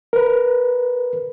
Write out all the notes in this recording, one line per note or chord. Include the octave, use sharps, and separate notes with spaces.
A#4 B4